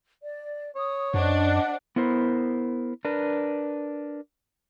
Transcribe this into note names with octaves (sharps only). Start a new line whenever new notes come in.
D5
C#5 D#6
F#2 D4 C5 D#5 F#5
B3 E4 A#4 C5
D4 A#4 B4